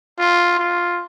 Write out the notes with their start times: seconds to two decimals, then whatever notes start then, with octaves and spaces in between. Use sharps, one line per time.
0.19 F4
0.59 F4